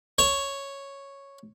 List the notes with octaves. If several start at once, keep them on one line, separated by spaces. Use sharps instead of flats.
C#5